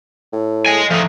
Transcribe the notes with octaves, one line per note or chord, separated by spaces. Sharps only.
A2
D#5 G#5
F3 A3 D#4